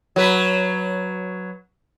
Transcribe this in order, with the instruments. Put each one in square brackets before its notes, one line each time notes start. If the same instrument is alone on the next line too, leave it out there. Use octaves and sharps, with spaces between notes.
[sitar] F#3 B4